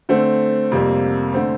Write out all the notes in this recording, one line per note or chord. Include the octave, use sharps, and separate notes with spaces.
D3 A3 C4
F2 C3 G3 A#3
D3 A3 C4